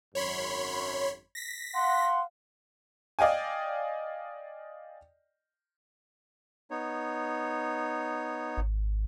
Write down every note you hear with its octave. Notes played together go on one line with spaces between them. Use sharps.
G#1 F#2 C#5 B5 C6
A#6 B6
F5 F#5 C6
D5 D#5 F5 G5 G#5
B3 D#4 C#5
G#1